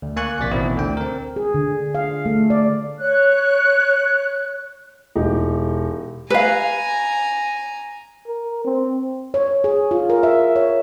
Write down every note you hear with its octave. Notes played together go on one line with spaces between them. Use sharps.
D2
A#3 G#5 C#6 F#6
A#1 C3 D5 A6 B6
A1 B2 D#3 C4 E4
D2 D3 G5
C4 A#4
G#4
D3
F5
A3
D5
C#5 F#6
E1 D#4 G4
B4 F5 G#5 A#5
A#4
C4
C#5
G#4
F4
A#4
E5
C#5